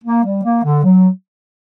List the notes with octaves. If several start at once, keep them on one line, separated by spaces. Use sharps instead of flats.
A#3
G3
A#3
D3
F#3